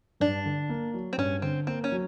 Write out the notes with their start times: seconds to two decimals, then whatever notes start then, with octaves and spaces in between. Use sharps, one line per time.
0.20 G2 D4
0.46 D3
0.69 A#3
0.94 F#3
1.13 C4
1.18 G2 C#4
1.42 D3 C4
1.67 A#3 C4
1.84 C#4
1.92 F#3